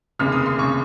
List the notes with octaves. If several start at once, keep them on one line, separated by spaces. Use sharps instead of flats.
F1 D#2 C#3 F6
D#6
C6
F1 C#3 C#6